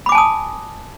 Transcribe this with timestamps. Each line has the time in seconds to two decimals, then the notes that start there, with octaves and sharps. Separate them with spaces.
0.06 B5
0.09 D6
0.12 G#5
0.15 A5
0.18 D#6